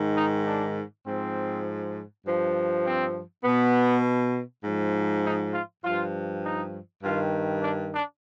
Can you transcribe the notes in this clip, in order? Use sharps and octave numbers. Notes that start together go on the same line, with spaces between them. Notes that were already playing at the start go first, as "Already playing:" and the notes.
Already playing: G#2 D#3
D#4
D4
G#2 F3 C4
G2 F3
C4
B2 B3
G#2 F3
D#4
F4
G2 F3 F4
D#4
G2 D#3 F4
D4
D4